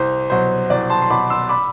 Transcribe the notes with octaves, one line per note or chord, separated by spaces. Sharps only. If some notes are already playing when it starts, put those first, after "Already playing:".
Already playing: C2 C5
B2 F#3 C5
C2 D5
A5 C6
C6
B2 F#3 B5 D6
C6 E6
B5 D6